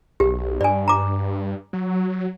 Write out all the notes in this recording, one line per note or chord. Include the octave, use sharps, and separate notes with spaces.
B1 G4
G2 D5 G#5
A#5 D6
F#3